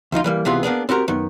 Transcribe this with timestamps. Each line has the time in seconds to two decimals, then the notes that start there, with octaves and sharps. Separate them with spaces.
0.12 D2 F3 D#4 F4
0.24 E3 G3 A#3
0.45 C#2 C3 E3 B3 F4 G#4
0.63 A#3 B3 D4 G#4
0.89 C4 F#4 G4 A#4
1.08 F#2 D#3 B3